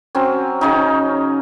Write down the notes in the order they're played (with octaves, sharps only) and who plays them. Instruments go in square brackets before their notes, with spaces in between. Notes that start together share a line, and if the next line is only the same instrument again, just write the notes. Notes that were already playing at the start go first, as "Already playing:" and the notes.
[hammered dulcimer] F#3 C4 C#4
C#3 C#4 D#4